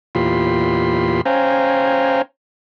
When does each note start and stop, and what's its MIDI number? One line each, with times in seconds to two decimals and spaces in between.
0.15 1.21 40
0.15 1.21 46
0.15 1.21 65
0.15 1.21 67
0.15 1.21 83
0.15 1.21 84
1.25 2.22 61
1.25 2.22 72
1.25 2.22 77
1.25 2.22 79
1.25 2.22 80
1.25 2.22 82